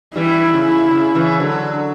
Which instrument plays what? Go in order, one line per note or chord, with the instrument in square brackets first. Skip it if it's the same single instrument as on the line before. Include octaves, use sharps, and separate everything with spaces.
[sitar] E3 G3 [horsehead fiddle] E4
[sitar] C#3
C#3
C#3 E3
D3 F#3